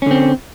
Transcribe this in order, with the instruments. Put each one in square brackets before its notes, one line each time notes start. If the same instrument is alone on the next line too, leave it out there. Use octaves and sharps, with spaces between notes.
[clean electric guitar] C#4
D3
C4